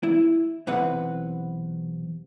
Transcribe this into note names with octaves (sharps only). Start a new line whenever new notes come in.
E4
B1 E2 C3 B4 F#5